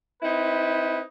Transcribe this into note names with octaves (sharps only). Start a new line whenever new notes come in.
C4 D#4 E4 B4